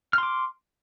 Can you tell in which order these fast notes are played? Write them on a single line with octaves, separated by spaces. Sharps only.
F6 C6 D6